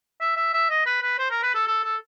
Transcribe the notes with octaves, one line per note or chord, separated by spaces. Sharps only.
E5
E5
E5
D#5
B4
B4
C5
A#4
B4
A4
A4
A4